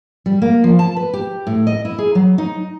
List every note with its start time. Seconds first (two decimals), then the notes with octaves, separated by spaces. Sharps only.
0.26 G3
0.42 A#3
0.64 F3
0.79 A5
0.96 B4
1.13 G4
1.47 A2
1.67 D#5
1.85 E4
1.98 G#4
2.15 F#3
2.38 D#4